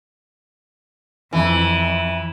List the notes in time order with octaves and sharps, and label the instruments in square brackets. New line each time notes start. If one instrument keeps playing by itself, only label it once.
[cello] F2 [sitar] E3